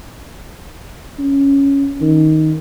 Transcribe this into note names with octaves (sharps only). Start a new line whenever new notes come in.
C#4
D#3